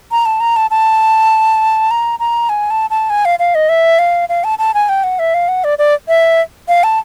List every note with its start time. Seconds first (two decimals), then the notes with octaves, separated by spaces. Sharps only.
0.12 A#5
0.26 A5
0.40 A#5
0.56 A5
0.71 A5
1.91 A#5
2.19 A#5
2.49 G#5
2.70 A5
2.90 A5
3.10 G#5
3.25 F5
3.39 F5
3.55 D#5
3.69 E5
3.99 F5
4.29 F5
4.44 A5
4.59 A5
4.74 G#5
4.89 G5
5.04 F#5
5.19 E5
5.34 F5
5.48 F#5
5.64 D5
5.79 D5
6.08 E5
6.68 F5
6.84 A5